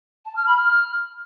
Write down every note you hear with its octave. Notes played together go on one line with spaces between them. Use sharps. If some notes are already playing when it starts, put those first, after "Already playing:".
A5
F6
B5
F6